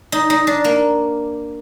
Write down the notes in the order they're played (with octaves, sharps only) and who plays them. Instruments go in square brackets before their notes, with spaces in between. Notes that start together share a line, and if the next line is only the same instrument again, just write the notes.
[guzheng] D#4
D#4
D4
A#3